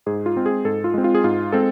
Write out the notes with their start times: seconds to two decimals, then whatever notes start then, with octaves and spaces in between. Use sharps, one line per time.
0.06 G#2 G#4
0.26 F4
0.36 G#3 C4
0.46 G#4
0.65 G#2 A4
0.84 F4
0.94 G#3 C4
1.04 F4
1.15 G#4
1.24 G#2 F4
1.52 G#3 C4 A4